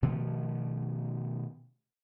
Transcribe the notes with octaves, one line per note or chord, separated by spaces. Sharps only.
B2 D#3 F3 A3